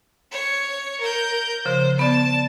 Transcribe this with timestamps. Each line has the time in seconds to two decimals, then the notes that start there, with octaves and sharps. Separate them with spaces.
0.32 C#5
1.02 A#4 G6
1.65 C#3 F3 C5
1.99 B3 D5 A5